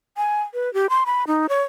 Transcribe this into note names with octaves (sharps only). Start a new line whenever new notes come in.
G#5
B4
G4
C6
B5
D#4
C#5